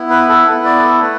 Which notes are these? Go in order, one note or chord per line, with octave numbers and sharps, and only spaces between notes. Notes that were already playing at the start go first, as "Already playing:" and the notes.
Already playing: B3 E4
B4
A4
B3 E4 B4
D5
A4
A3 B4